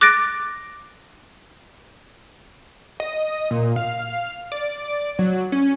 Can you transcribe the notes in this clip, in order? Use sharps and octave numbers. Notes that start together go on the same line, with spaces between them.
D6 F#6 A6 A#6 D7
D#5
A#2
F5
D5
F#3
C#4